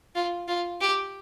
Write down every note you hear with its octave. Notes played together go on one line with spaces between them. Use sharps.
F4
F4
G4